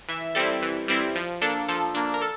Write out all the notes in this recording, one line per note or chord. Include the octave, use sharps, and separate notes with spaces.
E3 E5
G3 C4 E4 A4
E3
G3 C4 E4
F3
A#3 D4 A4
F3 A4
A#3 D4
A#4
A4